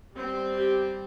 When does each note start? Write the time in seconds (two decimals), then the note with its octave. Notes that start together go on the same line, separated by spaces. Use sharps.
0.14 G3 C4
0.55 G4